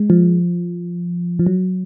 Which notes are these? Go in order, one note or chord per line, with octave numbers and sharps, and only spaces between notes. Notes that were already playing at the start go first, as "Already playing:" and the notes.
Already playing: G#3
F3
F3
F#3